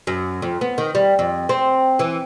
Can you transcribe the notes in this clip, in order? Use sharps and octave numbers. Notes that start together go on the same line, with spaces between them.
F#2
F2
B3
D#3
G3
F2
C4
E3